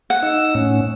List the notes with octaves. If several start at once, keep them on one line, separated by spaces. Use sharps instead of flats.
F#5
D#4 E6
A2 C#4